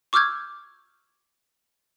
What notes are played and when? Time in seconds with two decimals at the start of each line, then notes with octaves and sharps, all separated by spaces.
0.13 C#6 D6 E6 F6 G6 G#6